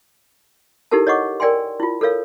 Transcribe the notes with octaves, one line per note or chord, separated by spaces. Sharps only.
D#4 E4 G4 A4 A#4 A5
C#5 D#5 F#5 C#6 D6
A#4 D5 G5 G#5 C6
E4 F4
A4 A#4 C#5 F5